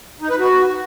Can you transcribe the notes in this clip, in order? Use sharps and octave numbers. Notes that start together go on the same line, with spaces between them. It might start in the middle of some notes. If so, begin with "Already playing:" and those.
D#4
B4
F#4